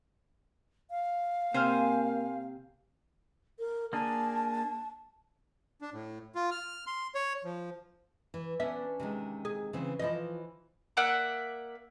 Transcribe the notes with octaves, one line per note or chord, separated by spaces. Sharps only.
F5
C3 A#3 C5 G#5 F6
A#4
A#3 D4 G#4 A5
D4
A2
F4
F6
C6
C#5
F3
E3
B3 C#4 D4 E5
C3 D#3 G#3
G#4
C#3 E3 C4
E3 F3 E4 D#5
A#3 D5 E5 F#5